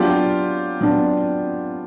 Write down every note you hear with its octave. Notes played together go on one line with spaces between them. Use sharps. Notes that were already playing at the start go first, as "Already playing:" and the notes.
Already playing: F#3 B3 D4 F4 G4
F#3 B3 D4